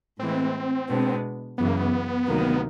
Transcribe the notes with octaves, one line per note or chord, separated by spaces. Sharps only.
A2 E3 G#3 B3 C4
B2 G#3 B3 D4
F#2 C#3 E3 B3
A#3
B3
D2 C3 D#3 F#3 A#3